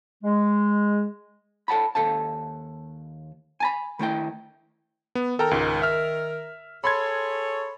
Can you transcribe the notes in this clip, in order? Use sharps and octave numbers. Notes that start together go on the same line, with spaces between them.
G#3
A4 F#5 A5 B5
D#2 A4 F5 A5
G#5 A5 B5
D#3 A3 E4 G5
B3
D#3 A4 A#4 G5 A#5
C#2 G#2
E5 F6
G#4 A4 C#5 B5 C6 G#6